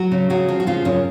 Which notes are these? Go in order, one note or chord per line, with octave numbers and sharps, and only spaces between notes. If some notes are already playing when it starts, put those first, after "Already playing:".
Already playing: F#3 F#4
C#3
C#3 F#3 F#4
F3
F#4
C#3 F3 F4
F#2 C#3 C#4